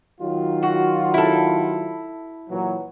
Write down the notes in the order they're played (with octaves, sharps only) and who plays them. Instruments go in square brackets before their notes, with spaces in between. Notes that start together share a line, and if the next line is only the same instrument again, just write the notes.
[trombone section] D#3 F#3 F4
[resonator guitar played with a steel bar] F#4
E4 A4
[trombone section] A#2 E3 F#3